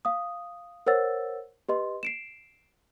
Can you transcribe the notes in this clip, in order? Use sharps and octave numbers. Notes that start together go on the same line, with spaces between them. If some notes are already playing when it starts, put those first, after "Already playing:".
F5 D#6
A#4 C5 C#5 F#5 E6 A6
G4 B4 D#5 C6
C7 D7 E7